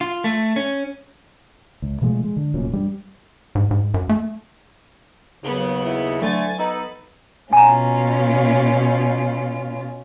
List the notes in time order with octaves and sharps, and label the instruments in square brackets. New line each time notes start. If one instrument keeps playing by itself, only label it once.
[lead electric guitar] F4
A3
C#4
[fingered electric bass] C#2
B2 F3 G#3 A3
G#3
D3
F1 F#2 A#2 C#4
G2 G3
[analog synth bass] G#2
G#2
F#2
A3
[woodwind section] D#2 C#3 [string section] F#3 B3
[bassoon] E4
[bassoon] D3 [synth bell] F#3 [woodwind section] A3 [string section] G#5 A6
[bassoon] B3 [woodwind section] D#4 A4 [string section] B4 [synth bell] A#5
[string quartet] B2 C#4 F4 [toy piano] G#5 A#5